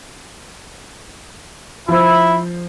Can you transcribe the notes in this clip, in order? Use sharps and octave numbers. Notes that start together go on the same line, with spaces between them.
F3 E4 C5